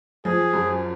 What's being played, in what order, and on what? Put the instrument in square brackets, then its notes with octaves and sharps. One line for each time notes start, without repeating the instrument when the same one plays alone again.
[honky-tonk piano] F3 [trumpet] G#4
[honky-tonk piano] F#2